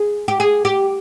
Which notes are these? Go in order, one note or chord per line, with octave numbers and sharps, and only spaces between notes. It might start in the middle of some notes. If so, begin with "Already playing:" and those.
Already playing: G#4
G4
G#4
G4